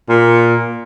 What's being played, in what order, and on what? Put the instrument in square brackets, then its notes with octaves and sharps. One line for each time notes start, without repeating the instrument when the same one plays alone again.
[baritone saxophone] A#2